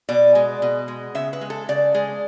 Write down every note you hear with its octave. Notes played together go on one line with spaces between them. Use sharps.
B2 D5
G#3
B2
G#3
C#3 E5
B4
G#3
A4
C#3 D5
G#3